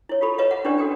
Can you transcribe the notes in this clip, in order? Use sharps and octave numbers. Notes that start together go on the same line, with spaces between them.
E4 C#5
F4 G4 A4 B5
B4 C#5 D#5 F5
F#5
C#4 D4 E4 G4 B4 D5
F#4 A4 B4 G5